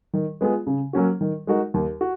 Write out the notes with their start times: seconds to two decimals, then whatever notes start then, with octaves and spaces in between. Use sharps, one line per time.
0.13 D#3
0.41 G#3 B3 F4 G#4
0.67 C#3
0.93 F#3 A#3 C#4 F#4
1.21 D#3
1.47 G#3 D#4 F#4 A#4
1.74 D#2
2.01 F#4